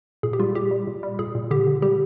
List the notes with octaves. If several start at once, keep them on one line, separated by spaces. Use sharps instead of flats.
A#2 G#4
G4
G3 F4
A#2 G4
G3
A#2
G3
A#2 G#4
A#2
D3 G4
D3
G3 G4